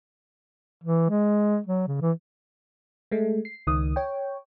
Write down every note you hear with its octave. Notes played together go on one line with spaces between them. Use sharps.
E3
G#3
F#3
C#3
E3
G#3 A3
C7
C#2 D#3 D#6
C#5 G5